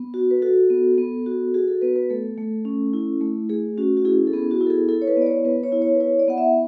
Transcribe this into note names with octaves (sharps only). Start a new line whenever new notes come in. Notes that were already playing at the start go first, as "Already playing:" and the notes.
Already playing: B3
F#4
B4
F#4 A4
B3
B3
F#4
F#4 G#4
A4
B3 B4
B4
A3 A4
A3
C#4
E4
A3
A3 G#4
C#4 F#4
F#4
E4 G#4
A4
B3 G#4
F#4
E4
A4
G#4
E4 A4
C#5
B4
B3 D5
C#5
B3 B4
C#5
E4
C#5
B4
E4 C#5
D5
B3 F#5
E5